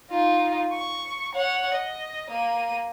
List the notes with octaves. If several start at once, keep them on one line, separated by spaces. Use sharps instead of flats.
D#4 F4
C#6
C#5 F#5
D#5
A#3 D#7